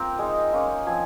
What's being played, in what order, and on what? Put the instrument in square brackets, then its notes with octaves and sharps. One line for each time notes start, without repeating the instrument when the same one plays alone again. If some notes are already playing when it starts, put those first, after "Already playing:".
Already playing: [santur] A#3 C4 F4 A#4 G5
G#3 D#4
A#3 C#4 F4
F3 C4 G#5